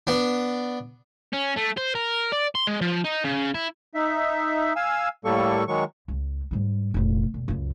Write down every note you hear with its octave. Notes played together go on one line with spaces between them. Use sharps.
B3 D4
C#4
A3
C5
A#4
D5
C6
G#3
F3
D#4
C#3
E4
D#4 E5
F5 G#5 E6
A2 G3 A#3 A4 C#6
D#3 F#3 G#3 C#6
C#2
G#2 G3
F1 A#1
E1
C#2 F#2